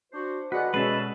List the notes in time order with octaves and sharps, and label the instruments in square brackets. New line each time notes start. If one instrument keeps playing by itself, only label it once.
[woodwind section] D4 F#4 C5
[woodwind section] D3 D#5 F#5 [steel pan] F#4 G#4 D5 [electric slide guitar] B4
[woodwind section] B2 [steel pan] G#3 C#4 [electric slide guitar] G#4 A4 E5 [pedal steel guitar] B4